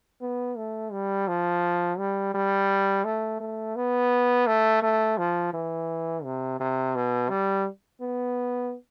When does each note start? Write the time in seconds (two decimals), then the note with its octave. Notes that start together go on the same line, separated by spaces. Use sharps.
0.21 B3
0.57 A3
0.92 G3
1.28 F3
1.98 G3
2.34 G3
3.05 A3
3.40 A3
3.76 B3
4.47 A3
4.82 A3
5.18 F3
5.54 E3
6.24 C3
6.60 C3
6.95 B2
7.30 G3
8.01 B3